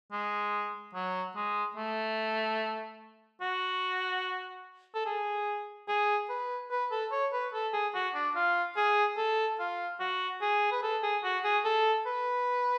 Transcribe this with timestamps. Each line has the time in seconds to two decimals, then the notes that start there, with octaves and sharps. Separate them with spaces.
0.12 G#3
0.94 F#3
1.36 G#3
1.77 A3
3.41 F#4
4.95 A4
5.06 G#4
5.88 G#4
6.29 B4
6.71 B4
6.91 A4
7.12 C#5
7.33 B4
7.54 A4
7.73 G#4
7.94 F#4
8.14 D4
8.35 F4
8.76 G#4
9.17 A4
9.59 F4
10.00 F#4
10.41 G#4
10.72 B4
10.83 A4
11.03 G#4
11.24 F#4
11.44 G#4
11.65 A4
12.06 B4